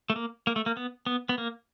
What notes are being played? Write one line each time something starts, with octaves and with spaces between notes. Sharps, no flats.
A3
A#3
A#3
A3
A#3
B3
B3
B3
A#3